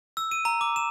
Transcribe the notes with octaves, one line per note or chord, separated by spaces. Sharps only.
E6
D#7
A#5
D6
E7